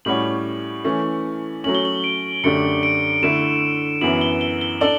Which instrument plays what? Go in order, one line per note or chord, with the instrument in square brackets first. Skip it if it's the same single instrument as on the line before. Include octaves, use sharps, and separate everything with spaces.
[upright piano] A2 G3 C#4 F#4 C#5 [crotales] F#7
[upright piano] E3 A3 C#4
[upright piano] F#3 A3 C#4 [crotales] F#7
[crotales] G7
F#7
D7
[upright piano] F#2 D3 A3 D4 G4 [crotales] C#7
[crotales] D7
[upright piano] D3 A3 E4 [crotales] E7
[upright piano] F#2 E3 B3 E4 [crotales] F#7
[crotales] G7
G7
G7
[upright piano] D4 A4 D5 [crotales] F#7